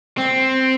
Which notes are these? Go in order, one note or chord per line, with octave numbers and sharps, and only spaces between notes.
C4